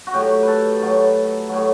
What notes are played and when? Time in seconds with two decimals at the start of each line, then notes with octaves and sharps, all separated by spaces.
0.07 F#4
0.13 A2 F#3 G4
0.43 A4 B4
0.81 A2 F#3
1.49 A2 F#3